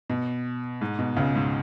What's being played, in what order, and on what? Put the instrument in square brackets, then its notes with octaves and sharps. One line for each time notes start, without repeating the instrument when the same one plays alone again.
[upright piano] B2
G#2
B2
C#2 C#3
G#2